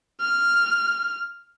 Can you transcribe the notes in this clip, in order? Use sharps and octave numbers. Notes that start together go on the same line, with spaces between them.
F6